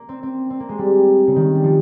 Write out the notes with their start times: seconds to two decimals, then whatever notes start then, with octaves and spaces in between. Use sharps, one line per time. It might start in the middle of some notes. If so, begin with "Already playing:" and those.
Already playing: A#3
0.09 C4
0.23 C4
0.50 C4
0.60 A#3
0.69 G#3
0.79 G3
1.27 C#3
1.36 D#3
1.55 G3
1.64 F3